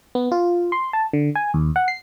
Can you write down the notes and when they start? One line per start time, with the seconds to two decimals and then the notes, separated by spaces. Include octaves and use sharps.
0.15 B3
0.32 F4
0.72 C6
0.93 A5
1.13 D3
1.35 G#5
1.54 D#2
1.76 F#5
1.88 C7